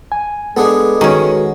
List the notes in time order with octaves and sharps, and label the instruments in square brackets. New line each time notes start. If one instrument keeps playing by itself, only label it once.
[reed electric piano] G#5
[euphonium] G#3 [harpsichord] B3 D4 G#4 [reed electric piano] A4 B4
[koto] D#3 C#4 [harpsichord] G#3 [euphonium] F#4